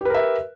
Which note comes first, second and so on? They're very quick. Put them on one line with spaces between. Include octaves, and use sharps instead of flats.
G4 B4 A#4 E5